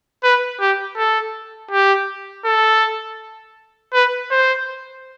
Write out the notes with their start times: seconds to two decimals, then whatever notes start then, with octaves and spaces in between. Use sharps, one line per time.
0.24 B4
0.61 G4
0.97 A4
1.71 G4
2.45 A4
3.93 B4
4.31 C5